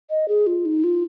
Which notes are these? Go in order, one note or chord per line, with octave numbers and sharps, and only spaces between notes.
D#5
G#4
F4
D#4
F4